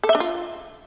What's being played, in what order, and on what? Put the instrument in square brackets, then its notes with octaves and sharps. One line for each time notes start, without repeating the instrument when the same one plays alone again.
[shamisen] A4
E5
D4
F4